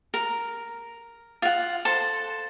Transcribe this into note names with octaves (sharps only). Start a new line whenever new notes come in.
A#4
F4 F#5
A4 C5 A5 C6